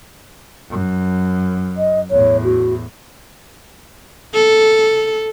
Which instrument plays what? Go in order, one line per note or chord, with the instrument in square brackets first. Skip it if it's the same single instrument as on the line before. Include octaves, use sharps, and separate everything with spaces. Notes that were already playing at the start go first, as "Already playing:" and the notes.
[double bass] F#2
[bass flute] D#5
[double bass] E2 A2 [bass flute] C#5
[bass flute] F#4
[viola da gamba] A4